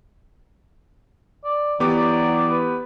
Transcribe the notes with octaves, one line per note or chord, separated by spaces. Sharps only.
D5
E3 F#3 B3 G4 D5 D6
B4